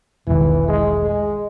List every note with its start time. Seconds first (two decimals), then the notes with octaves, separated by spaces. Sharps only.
0.27 E1 B1 D#3 E3
0.68 G#3
1.02 G#3